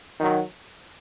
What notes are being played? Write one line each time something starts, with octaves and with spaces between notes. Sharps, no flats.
D#3 F#3